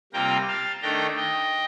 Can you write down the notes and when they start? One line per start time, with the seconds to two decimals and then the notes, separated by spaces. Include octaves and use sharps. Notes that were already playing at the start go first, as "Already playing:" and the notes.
0.13 C3 G3 A#3 F4 G5 A#5
0.48 F5 A5
0.82 D#3 A3 D4 G5 A#5
1.17 D#5 G5